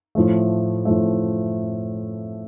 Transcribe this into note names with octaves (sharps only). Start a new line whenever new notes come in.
A2 F3 A3
A2 F3 A3